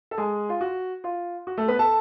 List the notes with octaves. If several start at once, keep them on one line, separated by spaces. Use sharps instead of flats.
A4
G#3 G#4
F4
F#4
F4
F#4
A3 A4
B3 B4
A4 A5